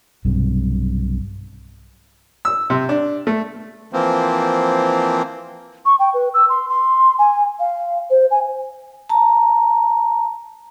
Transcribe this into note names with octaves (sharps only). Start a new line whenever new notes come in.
B1 G2 C3
E6
C3
D4
A3
E3 F3 A#3 C4
C#6
G5
B4
E6
C6
C6
G#5
F5
C5
G#5
A5 A#5